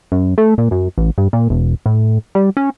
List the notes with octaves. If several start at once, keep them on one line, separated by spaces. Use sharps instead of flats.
F#2
A3
A#2
F#2
A1
G2
A#2
E1
A2
G3
C#4